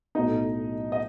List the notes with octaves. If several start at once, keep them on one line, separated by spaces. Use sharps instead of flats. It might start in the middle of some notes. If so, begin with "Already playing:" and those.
B1 A2 F#3 B3 D#4 D#5
D#5